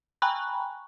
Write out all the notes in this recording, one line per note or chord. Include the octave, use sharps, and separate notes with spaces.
G5 G#5 A#5 B5 C#6 F#6